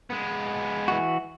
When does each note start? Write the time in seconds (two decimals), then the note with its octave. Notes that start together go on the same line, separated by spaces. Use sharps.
0.10 G#3 B3
0.88 E3 F#4